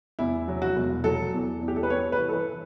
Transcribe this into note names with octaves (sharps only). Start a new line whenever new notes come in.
E2 E4
F#3
F#4
E1
F#3 A4
E2
E2
G4
A4
B4
B3 C#5
B4
E3
A4
B4
E3